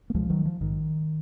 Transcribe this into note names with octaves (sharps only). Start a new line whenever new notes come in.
A#3
C#2 B2 F3 G#3
D#3 F#3
F3
A#1 G#2 D#3